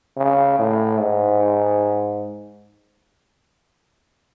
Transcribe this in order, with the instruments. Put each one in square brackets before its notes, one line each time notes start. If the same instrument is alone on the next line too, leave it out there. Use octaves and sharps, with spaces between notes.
[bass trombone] C#3
A2
G#2